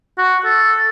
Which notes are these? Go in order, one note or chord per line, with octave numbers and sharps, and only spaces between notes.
F#4
A4